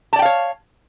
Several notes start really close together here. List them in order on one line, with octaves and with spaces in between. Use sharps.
A5 D5 G5 F5 C#5